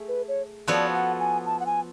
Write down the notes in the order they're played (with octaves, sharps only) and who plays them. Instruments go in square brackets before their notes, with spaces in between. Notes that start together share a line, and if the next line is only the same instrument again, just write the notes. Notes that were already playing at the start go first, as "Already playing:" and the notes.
Already playing: [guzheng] A3 G#4
[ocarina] B4
C#5
[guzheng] F3 B3 F#4 A4 C#5 [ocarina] D5
[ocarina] F#5
G#5
A5
F#5
G#5